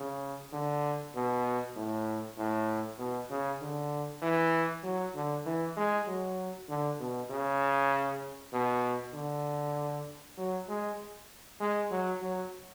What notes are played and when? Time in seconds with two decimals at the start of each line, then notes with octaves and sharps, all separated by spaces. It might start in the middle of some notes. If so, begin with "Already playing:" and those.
Already playing: C#3
0.53 D3
1.15 B2
1.76 A2
2.37 A2
2.98 B2
3.30 C#3
3.61 D3
4.22 E3
4.83 F#3
5.15 D3
5.46 E3
5.76 G#3
6.07 F#3
6.69 D3
6.99 B2
7.30 C#3
8.53 B2
9.14 D3
10.38 F#3
10.68 G#3
11.60 G#3
11.90 F#3
12.22 F#3